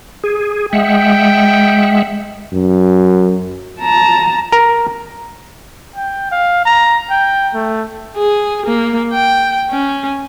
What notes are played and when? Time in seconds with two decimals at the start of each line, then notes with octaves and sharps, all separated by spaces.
0.24 G#4
0.73 G#3 E5 F#5 G5
2.53 F#2
3.80 A5 A#5
4.52 A#4
5.96 G5
6.31 F5
6.65 A#5
7.10 G5
7.54 A3
8.16 G#4
8.66 A#3
9.14 G5
9.71 C#4